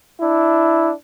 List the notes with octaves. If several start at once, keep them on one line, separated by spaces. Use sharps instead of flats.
D4 E4